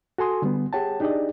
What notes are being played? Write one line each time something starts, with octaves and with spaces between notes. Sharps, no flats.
F#4 A4 G#5 C6 D#6
D3 G3 B3
G4 G#4 C#5 F#5 G5 A5
D4 D#4 G4 G#4 D5 D#5